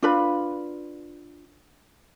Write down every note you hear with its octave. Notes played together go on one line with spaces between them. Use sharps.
D4 F4 B4 B5